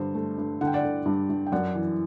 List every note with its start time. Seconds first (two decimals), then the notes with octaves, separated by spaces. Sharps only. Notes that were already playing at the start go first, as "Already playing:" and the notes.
Already playing: G2 D3 C5
0.15 A3
0.38 G2
0.61 D3 F#5
0.67 G5
0.74 D5 F#5
0.83 D3
1.06 G2
1.29 G2
1.46 G5
1.52 F#2 D5 F#5
1.75 E3